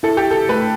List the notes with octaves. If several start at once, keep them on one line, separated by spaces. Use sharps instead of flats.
E4 A4
G4
A4
A3 B4